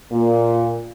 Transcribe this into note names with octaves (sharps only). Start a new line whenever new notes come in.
A#2